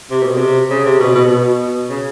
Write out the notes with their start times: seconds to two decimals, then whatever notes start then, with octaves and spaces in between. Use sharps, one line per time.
0.10 C3
0.24 B2
0.37 C3
0.70 C#3
0.85 C3
1.00 B2
1.15 B2
1.30 B2
1.90 C#3